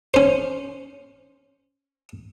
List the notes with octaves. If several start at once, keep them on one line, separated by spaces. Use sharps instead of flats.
C#4 C5